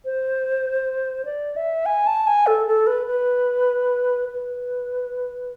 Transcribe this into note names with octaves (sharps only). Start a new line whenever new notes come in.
C5
D5
E5
G#5
A5
G#5
A4
A4
B4
B4
B4